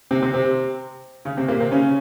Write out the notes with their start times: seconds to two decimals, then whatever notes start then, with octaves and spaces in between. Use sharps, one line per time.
0.11 C3 C4
0.22 C3 C4
0.34 C3 C4
1.25 C#3 C#4
1.37 C3 C4
1.48 A#2 A#3
1.60 C3 C4
1.72 C#3 C#4